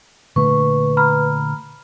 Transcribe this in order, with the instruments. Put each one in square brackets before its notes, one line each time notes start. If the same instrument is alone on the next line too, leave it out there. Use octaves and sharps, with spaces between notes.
[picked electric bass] A#2 D3 A3 [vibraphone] B4 [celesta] C#6
[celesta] A#5 B5 F6